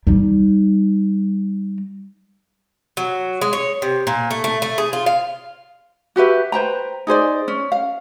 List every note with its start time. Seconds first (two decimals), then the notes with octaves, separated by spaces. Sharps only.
0.07 G3 D#4
2.97 F#3
3.41 G#3
3.53 C#5
3.82 C3
4.07 A#2
4.31 A3
4.44 A3
4.62 A3
4.78 G#4
4.93 F4
5.06 F5
6.16 F#4 G4 B4 E5
6.52 B4 C5 G5 A#5
7.07 D#4 G#4 C5 D5
7.48 C#4
7.72 F5